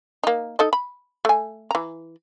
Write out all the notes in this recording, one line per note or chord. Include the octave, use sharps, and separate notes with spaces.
A#3 D#4
D#4 A4 D#5
B5
A3 G#5
E3 A#5